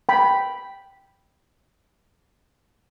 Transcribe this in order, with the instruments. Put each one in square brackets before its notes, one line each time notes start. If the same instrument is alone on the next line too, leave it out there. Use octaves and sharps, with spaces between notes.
[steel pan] G5 B5